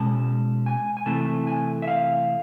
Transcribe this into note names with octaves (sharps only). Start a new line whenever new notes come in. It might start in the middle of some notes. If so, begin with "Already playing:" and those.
Already playing: B2 G#3 C#4 A5
G#5
G#5
C3 E3 A3 A5
G#5
E5
F5